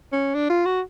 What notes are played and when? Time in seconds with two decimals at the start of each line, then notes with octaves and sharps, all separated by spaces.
0.12 C#4
0.35 D4
0.50 F4
0.65 F#4